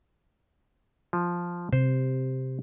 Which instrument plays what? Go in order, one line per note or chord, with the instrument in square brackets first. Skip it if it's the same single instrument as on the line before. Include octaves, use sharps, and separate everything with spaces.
[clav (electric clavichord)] F3
[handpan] C3 [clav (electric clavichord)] C5